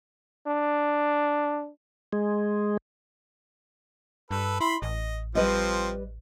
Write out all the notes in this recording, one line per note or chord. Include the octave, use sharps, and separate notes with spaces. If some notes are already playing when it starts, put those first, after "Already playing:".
D4
G#3
G2 A4 B4
E4 B5 C6
A1 D#5
F3 G3 C4 B4 D#5